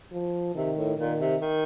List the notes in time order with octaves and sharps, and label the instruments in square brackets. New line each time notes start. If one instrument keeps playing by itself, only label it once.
[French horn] F3
[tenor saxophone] C3 [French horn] D#3
[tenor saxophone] A2
[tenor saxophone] A#2 [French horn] D#3
[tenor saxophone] C3
D#3